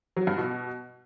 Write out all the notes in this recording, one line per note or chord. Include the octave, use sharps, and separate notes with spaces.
F#3
G2
B2